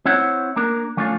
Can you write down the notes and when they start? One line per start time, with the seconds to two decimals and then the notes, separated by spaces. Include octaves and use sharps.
0.06 C4 E4 C#5 F#5
0.56 A#3 D4 A#4
0.97 F3 A3 C#4 D4 F4